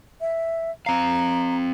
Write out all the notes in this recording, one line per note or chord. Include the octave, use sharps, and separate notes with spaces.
E5
C4 F5 A#5